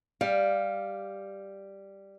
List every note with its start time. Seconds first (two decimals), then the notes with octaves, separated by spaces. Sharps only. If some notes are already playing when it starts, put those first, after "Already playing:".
0.21 G3 F5